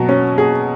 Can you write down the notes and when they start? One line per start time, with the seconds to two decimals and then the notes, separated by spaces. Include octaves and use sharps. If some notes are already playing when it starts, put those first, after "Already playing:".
Already playing: B2 F#3
0.09 C#4
0.38 G#4